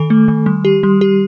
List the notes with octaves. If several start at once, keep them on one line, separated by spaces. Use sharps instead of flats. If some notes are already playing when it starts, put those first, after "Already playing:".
Already playing: D#3 A4
A3
D#3
G3
G4
G3
G4